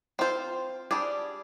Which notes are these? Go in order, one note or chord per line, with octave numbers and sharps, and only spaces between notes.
C4 F4 C5
G3 D4 G#4 D5